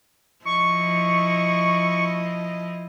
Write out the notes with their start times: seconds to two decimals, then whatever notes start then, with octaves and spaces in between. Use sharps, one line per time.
0.45 F3 E4 D#5 C#6